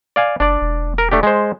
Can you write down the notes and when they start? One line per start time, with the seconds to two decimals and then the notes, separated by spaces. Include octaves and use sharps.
0.16 D5 F5 G#5
0.40 F#1 D4 D5
0.61 E1
0.98 A#4
1.11 A3 D4 G4
1.23 G#3 C5